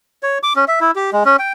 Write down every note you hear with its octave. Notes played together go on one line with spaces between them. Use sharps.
C#5
D6
C#4
E5
E4
G4
G#3
C#4
G5